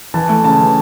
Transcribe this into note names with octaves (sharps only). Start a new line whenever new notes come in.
E3 A5
A3
C#3 A5
E3